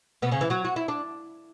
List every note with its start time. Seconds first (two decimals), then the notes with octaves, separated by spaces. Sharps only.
0.22 B2 B3
0.31 C#3 C#4
0.41 E3 E4
0.50 F#3 F#4
0.65 F#4
0.76 E4
0.88 D4